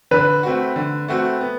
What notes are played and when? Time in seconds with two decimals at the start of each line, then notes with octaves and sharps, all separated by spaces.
0.11 D3 B4
0.43 A3 C4 F#4
0.76 D3
1.08 A3 C4 F#4
1.41 B3